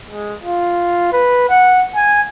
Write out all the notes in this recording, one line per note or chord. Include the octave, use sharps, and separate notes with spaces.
G#3
F4
B4
F#5
G#5